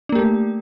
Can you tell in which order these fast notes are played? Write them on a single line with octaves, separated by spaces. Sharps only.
D4 A#3 G4 A3